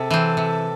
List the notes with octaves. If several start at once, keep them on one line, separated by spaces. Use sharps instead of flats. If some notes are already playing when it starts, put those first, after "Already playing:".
Already playing: C3 G#4 A4
E3 C4
C3